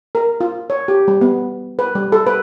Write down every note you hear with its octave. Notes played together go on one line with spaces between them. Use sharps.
A#4
F4
C#5
G4
G3
B3
B4
G3
A4
B4